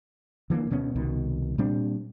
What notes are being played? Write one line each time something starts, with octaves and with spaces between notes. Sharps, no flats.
D3 E3 G#3 A#3
D2 B2 B3 C#4
C2 B2 D#3
A#2 G3 C4 D4